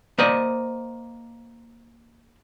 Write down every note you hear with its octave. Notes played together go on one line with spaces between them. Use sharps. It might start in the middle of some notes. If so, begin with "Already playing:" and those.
A#3 C5 D5 D#5